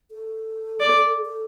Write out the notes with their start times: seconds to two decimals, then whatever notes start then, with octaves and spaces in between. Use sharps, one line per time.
0.11 A4
0.80 D5
1.25 A4